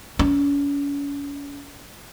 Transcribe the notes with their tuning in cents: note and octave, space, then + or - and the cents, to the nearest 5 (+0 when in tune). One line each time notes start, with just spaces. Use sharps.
C#4 +40